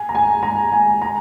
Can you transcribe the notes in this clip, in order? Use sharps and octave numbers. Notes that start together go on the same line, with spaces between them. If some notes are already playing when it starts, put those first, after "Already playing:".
Already playing: G#5
A#5
G#5
A#5
G#5
A#5